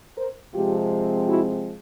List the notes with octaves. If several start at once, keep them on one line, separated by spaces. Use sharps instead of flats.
A#4 C5
C3 F3 G#3 C4 F4 G4
E4 F#4